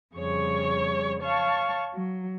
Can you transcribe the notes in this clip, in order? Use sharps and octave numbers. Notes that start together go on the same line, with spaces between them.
F2 C#3 G3 G#4 C#5 C#6
C#5 F5 A5 C#6
F#3